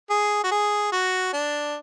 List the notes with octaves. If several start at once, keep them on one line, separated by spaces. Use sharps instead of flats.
G#4
F#4
G#4
F#4
D4